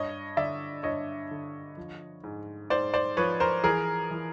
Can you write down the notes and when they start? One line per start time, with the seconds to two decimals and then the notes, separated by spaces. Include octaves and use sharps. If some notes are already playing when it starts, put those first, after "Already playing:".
Already playing: G2 C#5 D#5
0.37 D3 D5 E5
0.83 G2 C#5 D#5
1.31 D3
1.77 F3
2.24 G#2
2.70 G#2 C5 D5
2.94 C5 D5
3.17 F3 B4 C#5
3.40 A#4 C5
3.64 E3 G#4 A#4
4.11 E3